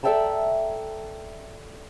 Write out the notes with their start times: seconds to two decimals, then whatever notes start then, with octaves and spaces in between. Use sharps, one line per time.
0.03 A4 D5 E5 G5 A5 A#5